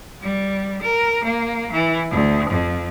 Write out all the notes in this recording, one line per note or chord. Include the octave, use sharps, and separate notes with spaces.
G3
A#4
A#3
E3
D2
F2